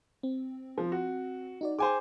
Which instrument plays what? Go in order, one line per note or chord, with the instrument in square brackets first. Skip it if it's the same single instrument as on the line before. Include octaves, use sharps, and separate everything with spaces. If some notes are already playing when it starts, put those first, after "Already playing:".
[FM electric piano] C4
[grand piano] F3
F#4
[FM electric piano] D#4 F#4 D5
[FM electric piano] G#4 G5 [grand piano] C5 G#5 D6